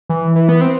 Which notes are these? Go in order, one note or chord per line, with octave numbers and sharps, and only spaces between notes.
E3
E3
B3
C4